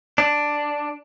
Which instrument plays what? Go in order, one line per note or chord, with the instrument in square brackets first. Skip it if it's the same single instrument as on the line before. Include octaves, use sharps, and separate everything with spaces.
[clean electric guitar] D4